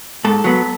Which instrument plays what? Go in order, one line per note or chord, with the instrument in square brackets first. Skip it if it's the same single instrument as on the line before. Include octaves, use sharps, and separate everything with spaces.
[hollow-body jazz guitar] G#2 A4
F#3 B3